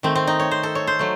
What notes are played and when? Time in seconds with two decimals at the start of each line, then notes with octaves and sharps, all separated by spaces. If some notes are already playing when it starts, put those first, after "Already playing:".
0.03 D#3 A3 C4
0.15 C4
0.27 D#4
0.40 C#5
0.51 C5
0.63 A4
0.75 C#5
0.87 C5
0.99 F#3 A3